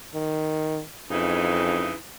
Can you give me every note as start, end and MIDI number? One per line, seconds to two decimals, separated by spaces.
0.14 0.82 51
1.11 1.90 41
1.11 1.94 49
1.11 1.94 52
1.11 1.94 63